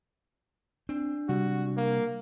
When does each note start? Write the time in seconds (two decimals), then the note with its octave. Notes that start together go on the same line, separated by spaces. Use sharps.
0.89 C4 D4
1.29 C3 G3 F#4
1.77 A#3